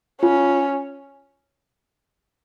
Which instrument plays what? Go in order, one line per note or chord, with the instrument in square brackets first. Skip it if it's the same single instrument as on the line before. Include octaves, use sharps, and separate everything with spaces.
[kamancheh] C#4 [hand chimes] F4